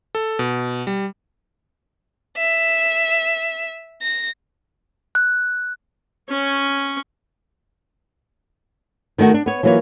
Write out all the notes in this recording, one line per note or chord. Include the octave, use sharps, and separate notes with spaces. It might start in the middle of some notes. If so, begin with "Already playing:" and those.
A4
B2
G3
E5
A#6
F#6
C#4 C#5
D#3 A3 D#4 F#4
D4
B3 C#5
E3 F#3 A#3 F4 B4 C#5